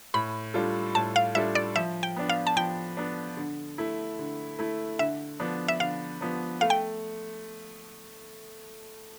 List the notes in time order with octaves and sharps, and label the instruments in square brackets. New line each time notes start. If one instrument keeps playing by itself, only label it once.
[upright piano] A2 [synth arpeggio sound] B5
[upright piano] G3 D4 F4 A4
[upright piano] A2 [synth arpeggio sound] A5
[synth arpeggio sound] F5
[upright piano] G3 D4 F4 A4 [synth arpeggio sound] E5
[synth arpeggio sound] D5
[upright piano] F3 [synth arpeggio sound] E5
[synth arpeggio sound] G5
[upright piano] B3 D4
[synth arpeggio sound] F5
A5
[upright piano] F3 [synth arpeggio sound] G5
[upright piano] B3 D4
D3
A3 E4
D3
A3 E4
[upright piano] D3 [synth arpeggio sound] E5
[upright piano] F3 B3 D4
[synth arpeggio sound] E5
[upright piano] D3 [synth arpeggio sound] F5
[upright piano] F3 B3 D4
[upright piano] A3 [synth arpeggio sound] F5
[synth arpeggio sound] G5